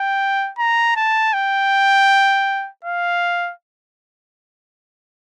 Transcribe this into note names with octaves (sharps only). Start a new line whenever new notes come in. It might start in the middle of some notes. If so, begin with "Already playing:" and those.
Already playing: G5
A#5
A5
G5
F5